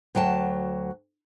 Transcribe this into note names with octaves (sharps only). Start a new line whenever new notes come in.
D2 F#3 G5 A5